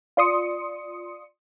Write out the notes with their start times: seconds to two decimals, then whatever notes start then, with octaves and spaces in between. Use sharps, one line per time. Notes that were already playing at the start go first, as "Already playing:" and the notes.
0.17 F4 D5 C6 D#6 C#7